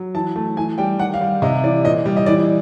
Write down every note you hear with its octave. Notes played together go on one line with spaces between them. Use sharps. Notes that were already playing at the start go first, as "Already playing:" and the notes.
Already playing: F#3
E3 A5
A3 A5
E3 G#5
G3 G5
D#3 F#5
F5
G3
C3 D#5
E3 D5
A#2 D#5
G3
D#5
E3 D5